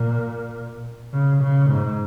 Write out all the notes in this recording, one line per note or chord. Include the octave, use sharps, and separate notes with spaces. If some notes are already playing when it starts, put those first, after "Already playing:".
Already playing: A#2
C#3
C#3
G#2